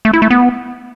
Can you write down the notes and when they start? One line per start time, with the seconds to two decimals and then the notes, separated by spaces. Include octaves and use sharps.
0.05 A3
0.13 E4
0.22 A3
0.30 B3